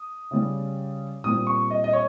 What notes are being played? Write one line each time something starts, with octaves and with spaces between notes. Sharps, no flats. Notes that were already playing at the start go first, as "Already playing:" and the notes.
Already playing: D#6
C#3 G3 C#4
A#2 G3 C4 D#6
C#6
D#5
D#5
C#5